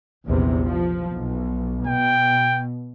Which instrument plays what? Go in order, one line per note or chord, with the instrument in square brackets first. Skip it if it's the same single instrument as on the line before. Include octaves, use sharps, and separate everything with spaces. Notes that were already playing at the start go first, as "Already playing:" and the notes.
[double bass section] A#1 E2 C3
F3
B1
[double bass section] B2 [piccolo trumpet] G5